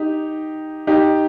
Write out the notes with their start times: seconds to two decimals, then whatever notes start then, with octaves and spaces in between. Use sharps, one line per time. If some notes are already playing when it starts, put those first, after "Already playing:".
Already playing: D#4 G4
0.87 D#4 G4